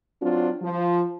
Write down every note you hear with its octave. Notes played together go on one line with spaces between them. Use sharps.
F#3 C4 D4 F4
F3